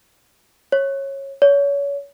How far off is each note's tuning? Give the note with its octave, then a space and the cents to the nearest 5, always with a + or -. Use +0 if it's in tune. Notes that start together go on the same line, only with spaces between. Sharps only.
C#5 -15
C#5 +30